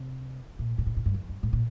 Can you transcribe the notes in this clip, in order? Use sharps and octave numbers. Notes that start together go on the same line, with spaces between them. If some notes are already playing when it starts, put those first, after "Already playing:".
Already playing: C3
A#2
A#2
A2
A2
G2
F2
G2
A2
A#2